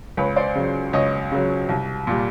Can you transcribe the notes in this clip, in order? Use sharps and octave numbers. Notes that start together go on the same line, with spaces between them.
C#2 B4 C#5
C5 D5
C#3 F#3
C#2 C#5 D#5
C#3 F#3
C2
A#2 G3